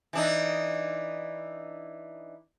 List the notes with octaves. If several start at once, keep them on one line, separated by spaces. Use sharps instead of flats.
E3 D4 D#4